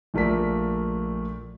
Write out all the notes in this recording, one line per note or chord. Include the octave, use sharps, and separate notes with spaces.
A#1 A#2 A3 A#4 D5 B6